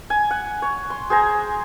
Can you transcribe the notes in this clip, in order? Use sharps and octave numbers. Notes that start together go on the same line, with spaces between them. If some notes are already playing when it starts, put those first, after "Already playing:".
G#5
F#5
C#5
C6
G#4 C5 G#5 A#5